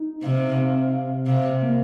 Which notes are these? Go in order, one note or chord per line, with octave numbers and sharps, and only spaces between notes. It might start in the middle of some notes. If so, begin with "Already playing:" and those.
Already playing: D#4
C3 F5
C3
C3
C3 F5
A#3